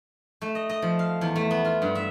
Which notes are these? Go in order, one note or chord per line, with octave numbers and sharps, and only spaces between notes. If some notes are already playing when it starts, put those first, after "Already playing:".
A3
D#5
D#5
F3
F5
E2
A3
B3
F4
G2
E5